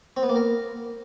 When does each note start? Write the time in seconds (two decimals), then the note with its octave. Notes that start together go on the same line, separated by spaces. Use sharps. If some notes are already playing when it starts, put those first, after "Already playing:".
0.17 C4
0.23 B3
0.29 A#3
0.36 A#4